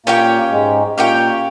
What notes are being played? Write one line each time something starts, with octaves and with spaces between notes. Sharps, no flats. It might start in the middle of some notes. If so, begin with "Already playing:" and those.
A#2 A#3 C#4 G4 C#5 G5
G#2 G#3
A#2 A#3 C#4 G4 C#5 G5